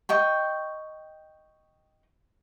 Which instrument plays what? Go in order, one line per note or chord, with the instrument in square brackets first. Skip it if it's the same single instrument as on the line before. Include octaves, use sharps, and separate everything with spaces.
[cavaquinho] D#5 G5 C#6